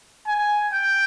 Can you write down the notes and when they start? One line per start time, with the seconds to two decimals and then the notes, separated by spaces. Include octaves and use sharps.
0.28 G#5
0.74 G5